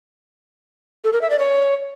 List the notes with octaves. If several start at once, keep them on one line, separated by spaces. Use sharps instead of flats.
A4
A#4
E5
D5
C#5